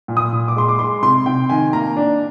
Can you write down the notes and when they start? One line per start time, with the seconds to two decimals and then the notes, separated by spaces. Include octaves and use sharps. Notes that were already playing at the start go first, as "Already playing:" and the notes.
0.08 A#2
0.17 D#6
0.33 A#2
0.48 D6
0.56 G#3 C6
0.69 D6
0.79 G#3 C6
1.03 C3 C6
1.26 C3 G5
1.50 D#3 G#5
1.73 A#3 A#5
1.97 D4